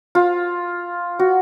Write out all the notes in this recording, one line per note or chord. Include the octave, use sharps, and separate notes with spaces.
F4
F#4